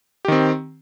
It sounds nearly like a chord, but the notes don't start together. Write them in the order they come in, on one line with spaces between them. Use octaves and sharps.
G4 D#3 C4